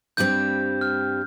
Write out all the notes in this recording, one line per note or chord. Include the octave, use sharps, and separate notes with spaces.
G2 G3 C4 G6
F6